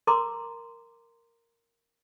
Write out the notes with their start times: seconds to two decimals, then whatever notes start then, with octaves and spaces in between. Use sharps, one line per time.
0.07 A#4 A#5 C6 D6